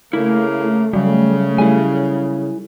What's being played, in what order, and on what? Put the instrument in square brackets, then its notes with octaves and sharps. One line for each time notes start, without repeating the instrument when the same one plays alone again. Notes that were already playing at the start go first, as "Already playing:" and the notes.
[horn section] C#3 A#3 [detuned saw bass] A3 [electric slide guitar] E4
[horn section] C#3 [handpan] F#3 [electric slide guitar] G3
[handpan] G3 G#4 A4 [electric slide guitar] E4 G#5